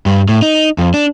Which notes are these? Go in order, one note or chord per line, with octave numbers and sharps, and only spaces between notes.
G2
A2
D#4
F2
D4